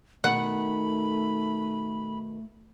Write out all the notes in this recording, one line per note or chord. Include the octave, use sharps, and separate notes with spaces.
B2 D#3 A3 F#5 B5